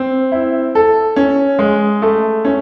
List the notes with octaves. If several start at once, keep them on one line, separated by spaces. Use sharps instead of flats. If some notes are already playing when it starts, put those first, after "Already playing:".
Already playing: C4
E4
A4
C#4
G#3
A3
C#4